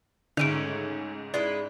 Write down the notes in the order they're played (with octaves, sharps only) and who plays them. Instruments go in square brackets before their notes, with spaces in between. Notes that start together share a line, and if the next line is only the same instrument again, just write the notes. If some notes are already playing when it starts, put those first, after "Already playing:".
[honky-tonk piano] C#2 G#2 [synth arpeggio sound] D3 [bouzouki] A3 C#4 [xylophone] D7 D#7 F7
[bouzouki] G#3 E4 B4 [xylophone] D5